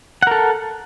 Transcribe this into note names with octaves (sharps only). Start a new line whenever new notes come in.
A4 A#4 F#5